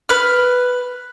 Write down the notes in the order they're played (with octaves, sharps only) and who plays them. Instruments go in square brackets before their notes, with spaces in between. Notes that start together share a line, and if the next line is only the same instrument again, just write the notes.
[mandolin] B4 F6